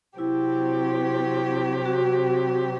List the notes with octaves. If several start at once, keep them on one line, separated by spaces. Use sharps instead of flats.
C3 F#3 C4 E4 G4
F#4